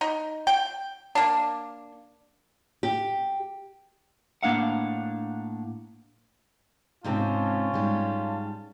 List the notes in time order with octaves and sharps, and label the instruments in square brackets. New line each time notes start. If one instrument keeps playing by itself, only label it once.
[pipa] D#4
G5
A#3 D4
[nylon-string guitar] G4
[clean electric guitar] A2 A#3 D4 F5 F#5
[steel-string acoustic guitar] G#2 C3 C4 [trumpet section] C#4 F4 A5
[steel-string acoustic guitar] G#2 G3